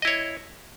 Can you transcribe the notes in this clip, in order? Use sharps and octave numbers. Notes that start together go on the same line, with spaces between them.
E4 C#5 D#5